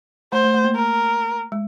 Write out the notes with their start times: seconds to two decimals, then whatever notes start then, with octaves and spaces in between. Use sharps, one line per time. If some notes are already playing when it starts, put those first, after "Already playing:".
0.33 A3 C5
0.44 A3
0.54 A3
0.64 A#3
0.76 A#4
1.52 G#3